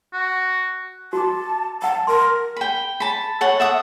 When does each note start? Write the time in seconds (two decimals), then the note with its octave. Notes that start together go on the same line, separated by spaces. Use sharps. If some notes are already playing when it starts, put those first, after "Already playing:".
0.13 F#4
1.13 F#4 A5 A#5 D6
1.82 F#5 A5 A#5
2.07 A#4 C6
2.56 G5 B5
3.00 A5 B5
3.41 A4 C#5 F#5
3.60 E5 F#5 D#6